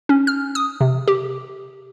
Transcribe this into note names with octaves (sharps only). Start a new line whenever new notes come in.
C#4
F6
D#6
C3
G4